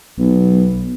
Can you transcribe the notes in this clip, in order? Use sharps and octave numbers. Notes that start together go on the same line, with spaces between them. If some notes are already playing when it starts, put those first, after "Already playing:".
B1